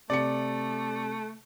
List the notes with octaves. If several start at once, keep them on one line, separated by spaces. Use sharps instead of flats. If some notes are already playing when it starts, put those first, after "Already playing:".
C3 A3 D5 C#7